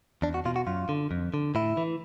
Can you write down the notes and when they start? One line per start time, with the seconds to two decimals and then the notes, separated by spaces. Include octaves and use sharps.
0.22 E2 D4
0.34 F#4
0.45 B2 F4
0.56 F#4
0.67 F#2 F4
0.89 D3
1.11 F2
1.34 D3
1.55 A2 E4
1.77 E3